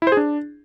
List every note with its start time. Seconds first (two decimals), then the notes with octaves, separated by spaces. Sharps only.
0.02 E4
0.07 C5
0.12 G#4
0.17 D4